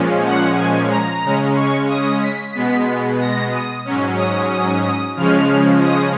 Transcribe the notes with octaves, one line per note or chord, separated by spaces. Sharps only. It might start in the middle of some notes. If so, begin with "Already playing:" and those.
Already playing: A#2 F3 G#3 C#4
F#5
G#5
A#5
C#3 G#3 C#4
C#6
D#6
B6
B2 G#3 B3
A#6
D#6
G#2 F#3 C#4
D#6
D#6
D#6
C#3 F3 G#3 C#4 F6
D#6